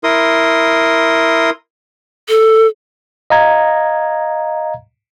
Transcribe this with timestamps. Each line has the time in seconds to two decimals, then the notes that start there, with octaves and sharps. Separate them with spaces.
0.04 E4 A#4 C6 D#6
2.29 A4
3.30 D#5 F5 A#5 G#6